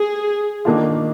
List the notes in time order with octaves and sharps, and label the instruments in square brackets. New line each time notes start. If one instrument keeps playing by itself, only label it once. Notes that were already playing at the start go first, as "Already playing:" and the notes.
Already playing: [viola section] G#4
[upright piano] D#3 A#3 D4 F4